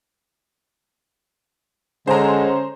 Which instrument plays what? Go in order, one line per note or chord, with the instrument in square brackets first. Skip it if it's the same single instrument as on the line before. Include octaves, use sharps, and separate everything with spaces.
[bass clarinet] D3 [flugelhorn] G#3 [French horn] C#4 [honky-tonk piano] C5 A#5